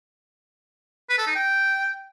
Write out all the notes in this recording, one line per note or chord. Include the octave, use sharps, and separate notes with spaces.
B4
A4
D#4
G5